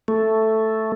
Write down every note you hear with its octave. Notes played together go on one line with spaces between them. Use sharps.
A3